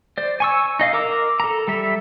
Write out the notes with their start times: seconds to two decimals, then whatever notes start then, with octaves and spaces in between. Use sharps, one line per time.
0.18 C5 D5
0.40 G#5 C#6 E6
0.79 D#4 D#5 F5
0.93 A#4 A#5 D6 E6
1.40 A4 A#5
1.68 G3 A4 E5